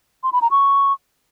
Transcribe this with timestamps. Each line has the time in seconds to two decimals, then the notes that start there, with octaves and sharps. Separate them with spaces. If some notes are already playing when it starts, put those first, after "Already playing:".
0.23 C6
0.32 B5
0.42 A#5
0.51 C#6